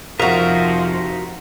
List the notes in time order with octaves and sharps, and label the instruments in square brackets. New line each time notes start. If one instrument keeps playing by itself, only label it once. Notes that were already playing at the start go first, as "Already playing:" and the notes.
[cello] F2 C3 [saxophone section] F3 [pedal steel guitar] D#4 E5 F5 [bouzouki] F#4 A#4